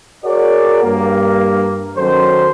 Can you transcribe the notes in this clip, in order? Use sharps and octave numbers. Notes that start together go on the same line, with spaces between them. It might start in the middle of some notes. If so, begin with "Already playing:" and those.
F#4 G#4 A#4 C#5 D5
G2 A#3
D#3 F#3 C#4 A4 C5